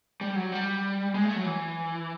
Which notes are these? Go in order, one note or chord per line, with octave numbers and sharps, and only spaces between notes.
G3
F#3
G3
G#3
A3
F#3
E3